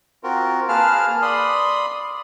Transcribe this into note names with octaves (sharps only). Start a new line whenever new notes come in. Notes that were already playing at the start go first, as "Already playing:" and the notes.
C4 F4 F#4 A#4
A#3 G#4 B4 F5 A5 F6
D5 B5 C6 D#6